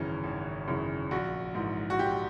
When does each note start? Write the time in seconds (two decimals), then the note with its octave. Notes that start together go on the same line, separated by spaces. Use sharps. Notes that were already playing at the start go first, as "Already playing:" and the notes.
Already playing: G#1 F#2 C#3 E3 C#4
0.24 G#1
0.68 F#2 C#3 E3
1.11 A#1 F#4
1.55 G#2 E3
1.90 F#4
1.99 A#1 G4